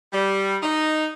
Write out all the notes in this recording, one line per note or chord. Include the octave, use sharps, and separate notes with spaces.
G3
D#4